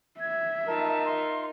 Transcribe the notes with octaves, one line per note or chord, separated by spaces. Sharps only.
E5 G#6
D#4 F4 A#4 A5
C6